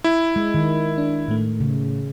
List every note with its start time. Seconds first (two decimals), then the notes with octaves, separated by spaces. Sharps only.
0.04 E4
0.36 G#3
0.54 D#3
0.98 D4
1.28 A2 A3
1.60 C#3